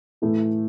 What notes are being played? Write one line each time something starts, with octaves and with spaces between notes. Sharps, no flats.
A2 E3 A3